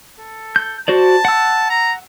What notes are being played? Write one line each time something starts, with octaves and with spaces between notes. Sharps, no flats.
A4
G6
F#4 C5 D5 A5
F#5 E6
A#5